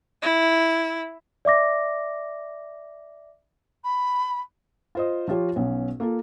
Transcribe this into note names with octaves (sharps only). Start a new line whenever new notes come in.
E4
D5 E5 D6 A#6
B5
F4 C5 D#5
F3 F4 G4 C#5
B1 B3 C#4
A#3 F4 A4